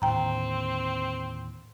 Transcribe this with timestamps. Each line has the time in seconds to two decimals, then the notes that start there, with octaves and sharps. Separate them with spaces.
0.02 D#2 A2 D3 C4 G5 A#5